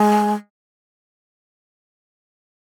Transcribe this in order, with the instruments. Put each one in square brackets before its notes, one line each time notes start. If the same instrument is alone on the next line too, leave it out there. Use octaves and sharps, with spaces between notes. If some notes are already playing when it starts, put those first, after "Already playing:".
Already playing: [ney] G#3